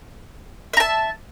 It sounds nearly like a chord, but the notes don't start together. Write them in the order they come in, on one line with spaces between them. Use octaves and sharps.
E5 A#5 A5